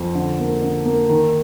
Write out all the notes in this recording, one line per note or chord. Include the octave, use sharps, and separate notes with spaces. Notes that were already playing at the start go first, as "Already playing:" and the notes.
Already playing: F2
D3
A#3
D3
A#3
D#3